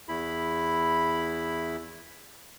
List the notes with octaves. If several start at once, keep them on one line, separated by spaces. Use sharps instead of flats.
E2 E4 B5